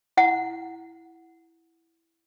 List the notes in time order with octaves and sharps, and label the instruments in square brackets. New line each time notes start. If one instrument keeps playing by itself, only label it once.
[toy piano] E4 F#5